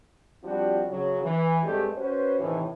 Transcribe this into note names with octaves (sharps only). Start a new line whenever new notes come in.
F3 G3 C4 D4 F#4 G4
C#3 F#3
E3
G2 G#3 A3 C4 G4
C#4 F#4 B4 C5
A2 C3 D#3 E3